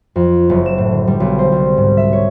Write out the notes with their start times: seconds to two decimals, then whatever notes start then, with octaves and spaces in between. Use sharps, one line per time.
0.16 F2
0.50 F#1
0.66 E7
0.78 A2
0.91 D3
1.07 G3
1.20 B1
1.39 C5
1.52 C2
1.77 G#2
1.97 E5
2.13 C#5